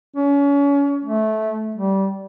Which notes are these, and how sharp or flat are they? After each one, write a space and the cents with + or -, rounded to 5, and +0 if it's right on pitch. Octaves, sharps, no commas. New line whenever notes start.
C#4 +35
A3 -15
G3 -20